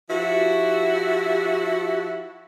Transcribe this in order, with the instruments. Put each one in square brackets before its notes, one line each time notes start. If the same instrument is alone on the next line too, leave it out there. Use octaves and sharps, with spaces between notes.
[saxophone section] F3 E4 F#4 [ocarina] G4